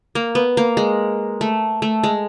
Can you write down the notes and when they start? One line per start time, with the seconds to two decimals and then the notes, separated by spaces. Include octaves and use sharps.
0.15 A#3
0.35 B3
0.57 A#3
0.77 G#3
1.41 A3
1.82 A3
2.04 G#3